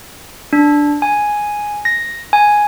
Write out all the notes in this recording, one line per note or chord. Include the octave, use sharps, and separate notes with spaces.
D4
G#5
A#6
G#5